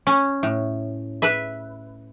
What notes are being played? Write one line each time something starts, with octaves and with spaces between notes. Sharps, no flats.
C#4
A2
B4 E5